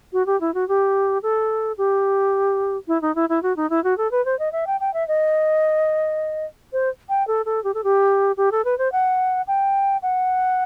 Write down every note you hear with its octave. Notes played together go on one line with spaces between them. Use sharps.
F#4
G4
E4
F#4
G4
A4
G4
E4
D#4
E4
E4
F#4
D#4
E4
F#4
A4
B4
C5
D#5
E5
G5
G5
E5
D#5
C5
G5
A4
A4
G4
A4
G4
G4
A4
B4
C5
F#5
G5
F#5